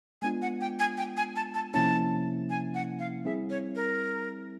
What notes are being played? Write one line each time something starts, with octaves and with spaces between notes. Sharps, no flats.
G#3 B3 D4 F4 G#5
F#5
G5
G#5
G5
G#5
A5
A5
C3 F3 A#3 C#4 E4 A5
G#5
F#5
F5
G3 C4 E4 G#4 E5
C#5
A#4